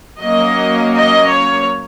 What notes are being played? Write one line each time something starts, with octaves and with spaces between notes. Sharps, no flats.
F#3 A#3 C#4 D#5
D#5
C#5